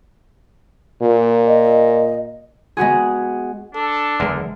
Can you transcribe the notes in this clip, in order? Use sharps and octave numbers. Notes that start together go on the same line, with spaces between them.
A#2
D#5
G#3 B3 F#4 G#4
D4 A4
F#1 E2 D3 G#3 A#3